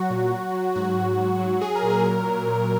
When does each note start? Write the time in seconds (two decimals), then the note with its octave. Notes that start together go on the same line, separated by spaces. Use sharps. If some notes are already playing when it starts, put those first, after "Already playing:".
Already playing: F#3 F#4
0.10 A#2
0.32 F#3
0.53 F#3
0.75 G#2 F#4
0.97 F#3
1.19 G#2
1.39 F#3
1.61 F#3 G#4
1.75 A#4
1.82 A#2
1.90 A#4
2.04 F#3
2.26 F#3
2.47 A#2